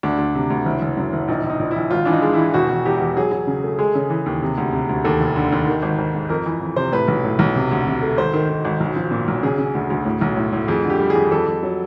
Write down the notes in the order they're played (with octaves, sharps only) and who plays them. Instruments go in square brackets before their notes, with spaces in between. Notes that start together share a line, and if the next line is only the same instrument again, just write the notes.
[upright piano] D2 D4
D2
C3
D2
F#1
F#1
F#2
F#1
A#1 D#4
A#1
D#4
A#1
A#1 E4
G#1 F4
E3 D4
D#4
G#3
E3 E4
E1 F#4
E1
E2 G4
E1
F#3 G#4
F#3
C#3
A3
G#3 G#4
C#3
E3
D#2
C3
D2
C3
D2
D#2 A4
F1
D3
D#2
D#3
G#1
G#1
G#2
F2 A#4
E3
F2
C3 C5
A2 B4
B1
A2
B1
C3
D2
C3
A3
G#1 C5
D#3
D#3
G#1
B1
F3
A#2
B1
C#3 G#4
C#3
D2
D2
A2
B1
A2
A2
F2 G#4
D3
G4
G3
G#4
F2
F2 A4
F2
F#3